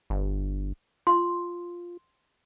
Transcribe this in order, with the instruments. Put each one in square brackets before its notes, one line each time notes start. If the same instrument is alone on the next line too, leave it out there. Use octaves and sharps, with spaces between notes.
[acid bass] G1
[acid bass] F4 [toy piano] C6